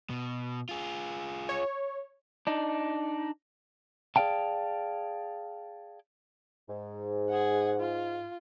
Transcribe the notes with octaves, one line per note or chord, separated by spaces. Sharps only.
B2
F4 G#4
C#5
D4 D#4
G#4 A#4 D5 F5 G5 A5
G#2
G#4 F#5
F4